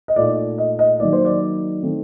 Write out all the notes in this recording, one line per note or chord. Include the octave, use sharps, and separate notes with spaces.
D#5
A#2 A3 D#4 D5
D#5
D#5
D#3 F#3 A#3 D#4 D5
C5
D5
D#3 A3 C4